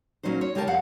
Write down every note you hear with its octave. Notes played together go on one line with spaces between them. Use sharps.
A#2 F#3 C#4 D#4 C5
C#5
C#3 G#3 G4 A#4 C5 A5
F2 F5 F#5